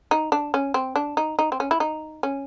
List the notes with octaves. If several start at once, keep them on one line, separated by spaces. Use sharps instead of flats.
D#4
D4
C#4
C4
D4
D#4
D#4
C4
C#4
E4
D#4
C#4